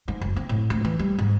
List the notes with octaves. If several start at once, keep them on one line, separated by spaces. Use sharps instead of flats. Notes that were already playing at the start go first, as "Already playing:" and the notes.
G#2
F#1
C4
A2
D2
E3
G3
G#2